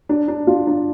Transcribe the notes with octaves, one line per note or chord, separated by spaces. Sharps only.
D4
D4
F4
D4